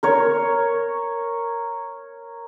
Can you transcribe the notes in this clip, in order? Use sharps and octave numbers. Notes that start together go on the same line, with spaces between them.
A#4 C#5